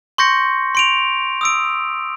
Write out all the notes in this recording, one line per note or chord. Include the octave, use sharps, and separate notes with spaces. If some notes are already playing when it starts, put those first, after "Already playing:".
C6 C#6 G6 A#6 C#7
C6 D7 F7
D#6 E6 D7